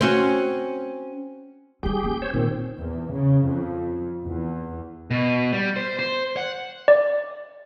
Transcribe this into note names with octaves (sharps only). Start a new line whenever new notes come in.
C4 C#4 F#4
G3 D#4 G4 G#4 G6
A#3 C#4
C5 C#5 E6
A#2 D#3 A#3 C4
E2
C#3
F2
E2
B2
G3
C5
C5
F#5
D5